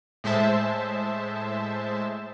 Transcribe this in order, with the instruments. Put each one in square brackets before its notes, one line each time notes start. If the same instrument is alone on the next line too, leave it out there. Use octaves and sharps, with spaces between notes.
[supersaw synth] A2 G#3 C5 E5 A5